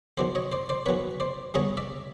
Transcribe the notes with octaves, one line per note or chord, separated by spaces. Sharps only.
D#3 F#3 B3 C5 D5
C#5 D#5
C5 D5
C5 D5
D#3 F#3 B3 B4 C#5
C5 D5
D3 G3 B3 D#4 C#5 D#5
D5 E5